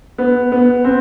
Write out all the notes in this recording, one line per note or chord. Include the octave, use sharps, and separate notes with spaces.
B3
B3
C4